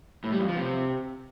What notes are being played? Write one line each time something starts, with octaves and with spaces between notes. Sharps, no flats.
A2
G3
F2
F3
C3